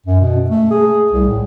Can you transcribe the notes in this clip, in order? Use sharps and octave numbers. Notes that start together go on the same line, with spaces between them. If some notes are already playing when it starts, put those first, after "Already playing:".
F#2
B2
A3
G#4
C2
A2